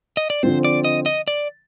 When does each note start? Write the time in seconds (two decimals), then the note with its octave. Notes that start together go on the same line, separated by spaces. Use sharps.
0.17 D#5
0.30 D5
0.43 D3 F3 C4 C5
0.65 D5
0.85 D#5
1.06 D#5
1.28 D5